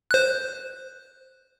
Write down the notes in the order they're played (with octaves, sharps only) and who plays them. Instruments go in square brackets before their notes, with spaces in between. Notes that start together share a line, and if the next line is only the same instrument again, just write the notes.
[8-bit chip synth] C5 F#6